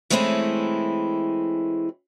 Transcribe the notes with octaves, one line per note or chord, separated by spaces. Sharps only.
E3 G#3 A3 C4 C#4 E4